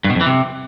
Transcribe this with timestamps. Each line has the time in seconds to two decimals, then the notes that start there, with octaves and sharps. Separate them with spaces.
0.04 G2
0.10 B2
0.15 F2
0.21 E3
0.26 C3